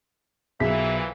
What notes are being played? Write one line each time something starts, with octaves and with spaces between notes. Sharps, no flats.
B1 F2 A#2 E3 G#4 E5 B6